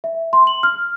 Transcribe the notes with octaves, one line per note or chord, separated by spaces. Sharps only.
E5
C6
F#7
F6